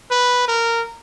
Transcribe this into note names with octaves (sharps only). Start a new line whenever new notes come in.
B4
A#4